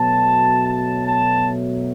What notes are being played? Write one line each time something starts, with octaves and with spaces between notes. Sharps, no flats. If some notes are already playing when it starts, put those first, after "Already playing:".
Already playing: B2 F#3 A3 A5
A5
A5